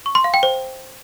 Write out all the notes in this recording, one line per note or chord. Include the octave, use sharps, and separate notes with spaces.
C#6
C6
F5
G5
C5